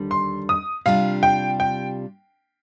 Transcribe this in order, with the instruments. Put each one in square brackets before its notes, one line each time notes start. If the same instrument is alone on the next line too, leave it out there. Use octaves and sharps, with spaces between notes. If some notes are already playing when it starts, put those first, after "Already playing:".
Already playing: [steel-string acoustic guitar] D#2 D3 G3
[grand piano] C6
D#6
[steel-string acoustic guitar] C3 G3 D4 F4 [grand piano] F5
[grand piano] G5
G5